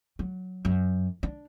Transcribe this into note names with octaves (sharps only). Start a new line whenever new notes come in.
F#3
F#2
D4